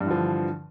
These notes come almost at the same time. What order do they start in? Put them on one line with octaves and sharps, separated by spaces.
G2 E3 D3 F3